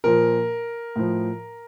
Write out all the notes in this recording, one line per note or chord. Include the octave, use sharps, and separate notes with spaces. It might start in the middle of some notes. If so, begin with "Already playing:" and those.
A#2 F3 A#4
A2 F3